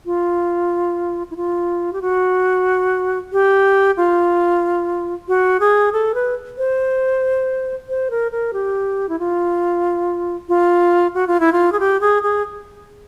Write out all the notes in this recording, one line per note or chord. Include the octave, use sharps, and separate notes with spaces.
F4
E4
F4
G4
F#4
G4
F4
F#4
G#4
A4
B4
C5
C5
A#4
A#4
G4
E4
F4
F4
F#4
F4
E4
F4
G#4
G4
G#4
G#4